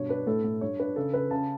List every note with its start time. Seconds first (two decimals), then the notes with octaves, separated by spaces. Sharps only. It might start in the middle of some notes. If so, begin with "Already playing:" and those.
Already playing: G2 B2 C#5
0.09 D4 B4
0.27 A2 A4
0.44 A2
0.61 G2 C#5
0.80 D4 B4
0.96 C#3 A4
1.14 C#3 B4
1.31 C#3 A5